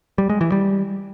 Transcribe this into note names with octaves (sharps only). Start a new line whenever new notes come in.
G3
G#3
E3
G3